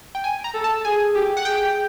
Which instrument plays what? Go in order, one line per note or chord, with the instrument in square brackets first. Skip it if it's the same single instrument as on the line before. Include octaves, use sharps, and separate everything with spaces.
[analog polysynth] G5
G#5
A#5
[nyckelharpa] A4
[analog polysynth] A5
[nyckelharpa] G#4 [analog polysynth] G#5
[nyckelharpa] G4
[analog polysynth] F#5
[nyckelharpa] G#4 [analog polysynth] G5